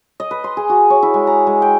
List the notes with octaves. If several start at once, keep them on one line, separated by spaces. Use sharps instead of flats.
D#5
B4
C6
G#4
F#4
C#5
E4
G#3
A#5
G#3
G5